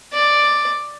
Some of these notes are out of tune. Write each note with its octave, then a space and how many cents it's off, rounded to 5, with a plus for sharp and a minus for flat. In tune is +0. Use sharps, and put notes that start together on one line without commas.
D5 +5